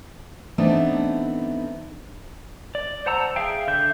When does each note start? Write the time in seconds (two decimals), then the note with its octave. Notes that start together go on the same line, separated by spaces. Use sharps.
0.58 E3 A3 B3 C4 D4 D#4
2.75 D5
3.06 C5 F#5 A5 A#5 E6
3.36 G#4 E5 F5 G5
3.67 D3 E5 G6